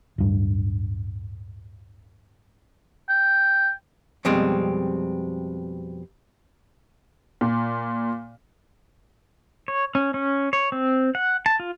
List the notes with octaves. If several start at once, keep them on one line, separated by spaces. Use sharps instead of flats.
D1 G2
G5
F2 B2 G3 G#3 C4
A#2
C#5
C#4
C#4
C#5
C4
F#5
A5
F4